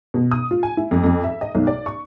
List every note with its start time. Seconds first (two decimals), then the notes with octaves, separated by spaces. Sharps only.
0.14 B2
0.31 D#6
0.51 F4
0.63 G#5
0.77 E4
0.91 F2
1.04 F2
1.24 E5
1.41 D#5
1.55 B1
1.67 D5
1.86 C#6